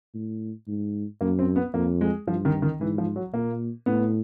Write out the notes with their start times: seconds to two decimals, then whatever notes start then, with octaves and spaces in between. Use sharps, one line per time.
0.15 A2
0.68 G#2
1.21 F#2 A#3
1.39 C4
1.56 B3
1.74 F2 A#3
2.01 G#3
2.27 G2 F3
2.45 D#3
2.62 D#3
2.80 G#2 E3
2.98 F3
3.16 F#3
3.34 A#2 A#3
3.86 A2 B3